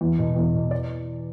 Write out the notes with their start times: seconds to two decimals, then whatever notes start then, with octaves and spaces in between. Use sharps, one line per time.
0.01 E2
0.18 B2
0.36 E2
0.54 B2
0.71 D5